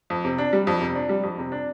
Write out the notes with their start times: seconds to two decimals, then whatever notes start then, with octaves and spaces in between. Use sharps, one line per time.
0.10 F2
0.25 C3
0.38 D4
0.53 G3
0.67 F2
0.81 C3
0.95 D4
1.09 G3
1.23 F2
1.38 C3
1.52 D4